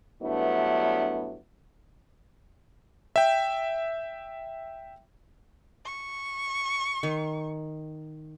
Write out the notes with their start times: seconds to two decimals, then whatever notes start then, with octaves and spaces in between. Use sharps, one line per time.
0.21 G2 F#3 A3 B3 D4 E4
3.16 E5 G5
5.85 C#6
7.03 D#3